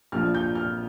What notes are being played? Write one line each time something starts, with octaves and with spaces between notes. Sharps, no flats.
A#1 A#2 F3 F6
G6
F6